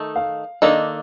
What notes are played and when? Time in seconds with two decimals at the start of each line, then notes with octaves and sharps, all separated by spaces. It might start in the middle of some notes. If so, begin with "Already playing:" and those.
Already playing: D#3 A3 D#4 A4
0.16 F5
0.62 D#3 A#3 D4 A4 D#5